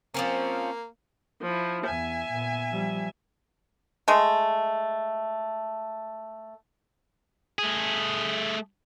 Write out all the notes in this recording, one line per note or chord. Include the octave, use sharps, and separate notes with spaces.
F3 A#3 C4 C#4
F3 E4
E2 B3 E5 G#5
A#2 B3
F3 G3
G#3 A3
A3 G#4